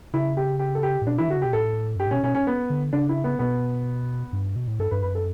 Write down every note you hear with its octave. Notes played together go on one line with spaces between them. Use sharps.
C#3 E4
G4
G4
A4
G4
A2
B2 D4
E3 E4
D3 F#4
C#3
B2 G4
A2 A4
F#2
G2 G4
A2
B2 C#4
B2 C#4
C#4
B3
D3
C#3 D4
E4
B3
B2 B3
G2
B2
A2
G2 A4
G2 B4
F#2 B4
A4